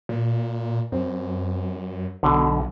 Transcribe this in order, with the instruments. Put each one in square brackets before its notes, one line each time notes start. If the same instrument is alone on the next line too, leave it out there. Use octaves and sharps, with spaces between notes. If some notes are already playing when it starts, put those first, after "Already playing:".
[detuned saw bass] A#2
[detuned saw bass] F#2 [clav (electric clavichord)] C4
[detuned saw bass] B1 [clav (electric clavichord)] B2 D3